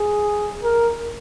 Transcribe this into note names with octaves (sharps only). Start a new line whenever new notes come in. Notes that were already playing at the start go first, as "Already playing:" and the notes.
Already playing: G#4
A#4